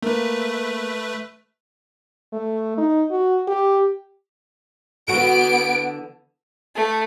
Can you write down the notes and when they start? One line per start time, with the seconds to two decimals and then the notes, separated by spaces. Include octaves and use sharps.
0.02 A3 A#3 B4
2.32 A3
2.77 D#4
3.11 F#4
3.47 G4
5.08 D3 E3 B3 F#4 D7
6.76 A3